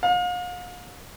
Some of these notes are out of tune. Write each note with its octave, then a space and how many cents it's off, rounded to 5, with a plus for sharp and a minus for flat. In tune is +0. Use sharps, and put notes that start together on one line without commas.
F5 +40